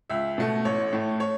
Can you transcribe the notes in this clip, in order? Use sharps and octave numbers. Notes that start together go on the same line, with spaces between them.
C#2 E5
B2 A3
A1 C#5
A2 A3
C#5